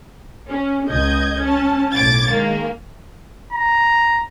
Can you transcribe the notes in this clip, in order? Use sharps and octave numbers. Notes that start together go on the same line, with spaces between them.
C#4
C#2 D#5 G6 G#6
C#4 A5
B1 A2 D6 G#6 A6
D#3 G#3 A#3
A#5